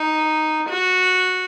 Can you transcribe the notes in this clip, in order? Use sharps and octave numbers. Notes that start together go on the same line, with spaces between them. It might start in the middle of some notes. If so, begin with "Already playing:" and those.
Already playing: D#4
F#4